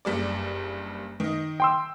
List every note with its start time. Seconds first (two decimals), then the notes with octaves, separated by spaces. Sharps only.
0.05 F#1 G2 D5
1.20 D#3 D#5
1.60 G5 C6 E6